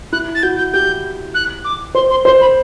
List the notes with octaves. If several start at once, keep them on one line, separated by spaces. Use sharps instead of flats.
E4 F#6
A6
F#4 G6
G6
G4 G6
F#6
D6
C5 C6
C6
C5 C6
B5